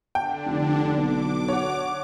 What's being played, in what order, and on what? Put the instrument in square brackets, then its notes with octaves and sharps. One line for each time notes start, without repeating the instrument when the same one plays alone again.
[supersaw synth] D3 D4 [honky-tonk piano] G5
[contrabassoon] F1
[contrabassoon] B1 [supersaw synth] D6
[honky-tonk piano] F#4 C#5